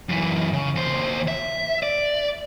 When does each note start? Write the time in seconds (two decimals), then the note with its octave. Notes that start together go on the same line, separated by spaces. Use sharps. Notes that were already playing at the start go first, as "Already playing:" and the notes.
0.09 F#2 E3
0.53 C#3
0.75 D#2 C5
1.28 E5
1.83 D5